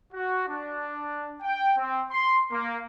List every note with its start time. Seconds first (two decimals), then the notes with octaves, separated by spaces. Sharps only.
0.13 F#4
0.48 D4
1.42 G5
1.78 C4
2.11 C6
2.52 A#3